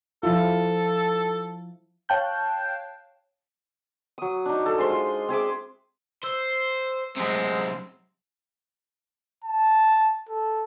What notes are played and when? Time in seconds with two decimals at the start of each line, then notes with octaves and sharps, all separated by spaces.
0.23 F3 E4 F4 A4
2.09 C#5 F5 G5 A5 F#6 G6
4.18 F#3 D#6
4.46 D4 D#4
4.66 A4
4.78 G#3 C5 C6
4.90 F4
5.29 C4 G#4 E5 D6
6.24 C5 E6
7.17 F#2 C3 G#3 C4
9.44 A5
10.29 A4